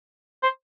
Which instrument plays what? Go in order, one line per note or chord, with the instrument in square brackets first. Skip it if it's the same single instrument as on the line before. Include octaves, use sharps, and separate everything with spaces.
[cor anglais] C5